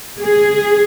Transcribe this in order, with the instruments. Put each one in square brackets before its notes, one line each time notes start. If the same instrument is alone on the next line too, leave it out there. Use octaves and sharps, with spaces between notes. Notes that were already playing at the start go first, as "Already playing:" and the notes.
[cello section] G#4